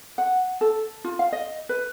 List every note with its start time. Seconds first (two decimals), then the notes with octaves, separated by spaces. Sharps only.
0.18 F#5
0.61 A4
1.04 F4
1.19 F5
1.32 D#5
1.69 B4